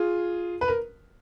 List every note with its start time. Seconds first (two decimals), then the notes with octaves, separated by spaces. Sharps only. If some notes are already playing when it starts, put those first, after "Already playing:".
Already playing: F4 G#4
0.61 B4
0.68 A#4